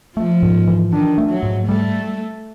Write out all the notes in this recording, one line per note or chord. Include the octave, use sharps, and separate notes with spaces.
F3 A3
G#2
E3
D#3 D4
A3
F#3
G#2
G3 A3